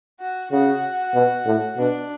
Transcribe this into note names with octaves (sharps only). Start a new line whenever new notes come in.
F#4
C#3 F#4
B2
A2
B2 D4